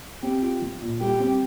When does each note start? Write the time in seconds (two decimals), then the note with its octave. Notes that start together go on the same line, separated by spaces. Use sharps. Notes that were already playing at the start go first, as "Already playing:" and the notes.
0.23 C4 G4
0.42 F4
0.62 F3
0.82 A#2
1.01 G3 G4
1.20 C4